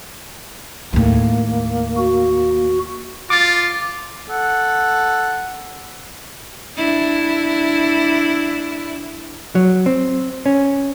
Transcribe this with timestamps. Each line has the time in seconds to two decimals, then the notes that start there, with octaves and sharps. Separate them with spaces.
0.93 D#2 A2 A#3
1.97 F#4
3.30 F4 D6 A6
4.29 A4 F#5
6.77 D4 E4
9.55 F#3
9.86 C4
10.46 C#4